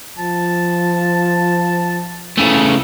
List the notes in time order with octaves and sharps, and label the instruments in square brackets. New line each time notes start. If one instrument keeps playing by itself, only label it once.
[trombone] F3 [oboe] A5
[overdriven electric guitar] C#3 A3 [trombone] E3